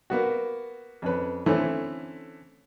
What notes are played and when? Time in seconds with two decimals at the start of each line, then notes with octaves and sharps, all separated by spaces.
0.10 A#3 B3 F#4
1.02 F2 C#4 B4
1.46 D3 E3 A3 C4 C#4